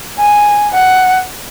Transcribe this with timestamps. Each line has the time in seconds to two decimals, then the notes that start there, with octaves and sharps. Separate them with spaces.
0.19 G#5
0.74 F#5